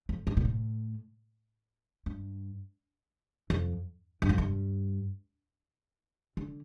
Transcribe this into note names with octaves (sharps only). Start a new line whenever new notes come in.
F2
G2
A#2
A2
G2
F2
G2
F2
G2
D3